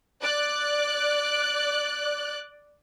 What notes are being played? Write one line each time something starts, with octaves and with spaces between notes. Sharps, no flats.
D5 F#6